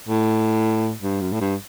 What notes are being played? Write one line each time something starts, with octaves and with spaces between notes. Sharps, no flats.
A2
G2
F#2
A2
G2